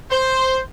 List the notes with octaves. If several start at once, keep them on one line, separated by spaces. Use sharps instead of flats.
C5